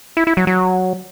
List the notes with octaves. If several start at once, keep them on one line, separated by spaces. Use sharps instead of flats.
E4
E4
F#3
F#3